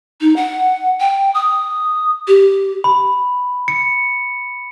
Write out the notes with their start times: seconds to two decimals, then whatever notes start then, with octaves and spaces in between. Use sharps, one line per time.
0.21 D#4
0.36 F#5
1.00 G5
1.35 D#6
2.27 G4
2.84 B5
3.68 C#7